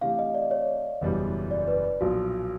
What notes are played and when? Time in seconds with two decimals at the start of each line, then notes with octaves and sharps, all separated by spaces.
0.01 C3 E3 A3 D4 G4 F5
0.19 D#5
0.34 D5
0.51 C#5
1.01 F#1 E2 B2 G3
1.51 D5
1.67 B4
2.01 B1 A#2 F3 F#4